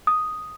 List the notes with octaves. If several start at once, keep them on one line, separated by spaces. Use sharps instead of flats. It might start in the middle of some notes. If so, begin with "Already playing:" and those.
D#6